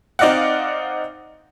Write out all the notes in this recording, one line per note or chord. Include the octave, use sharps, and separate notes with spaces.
C4 D#4 D5 D#5 F5 F#5